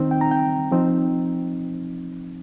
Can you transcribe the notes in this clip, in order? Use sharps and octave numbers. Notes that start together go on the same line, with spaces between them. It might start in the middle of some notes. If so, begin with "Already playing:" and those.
Already playing: D#3 C4 D#4
G5
A#5
G5
F3 C4 D#4